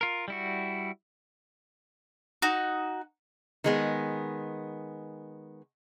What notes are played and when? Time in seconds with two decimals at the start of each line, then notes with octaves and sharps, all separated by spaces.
0.01 F4 A#4
0.28 G3 E4 F#4
2.42 D#4 F#4
3.64 D#3 G#3 B3